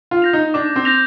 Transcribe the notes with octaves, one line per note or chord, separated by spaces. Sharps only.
F4
G6 A#6 F7
D#4
D4 D6
C4
G6 A#6 F7